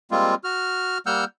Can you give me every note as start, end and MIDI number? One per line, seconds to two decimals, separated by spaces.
0.11 0.35 55
0.11 0.35 56
0.11 0.35 58
0.11 0.35 60
0.11 0.35 65
0.44 0.98 66
0.44 0.98 89
1.06 1.25 55
1.06 1.25 58
1.06 1.25 78
1.06 1.25 88
1.06 1.25 89
1.06 1.25 91